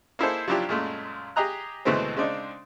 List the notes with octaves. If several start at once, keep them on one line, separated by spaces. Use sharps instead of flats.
A#3 D#4 E4 G#4 A4 C5
F3 F#3 D4 E4 F4 G4
F#2 A#2 G#3 A3
G4 G#4 D#5 A#5 F#6
D2 B2 E3 G#3 A3 C4
C#3 G#3 C4 D4 D#4